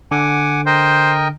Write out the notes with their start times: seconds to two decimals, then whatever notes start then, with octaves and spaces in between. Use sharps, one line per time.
0.11 D3 F#5 G#5 D6
0.66 A#4 C5 D#5 G5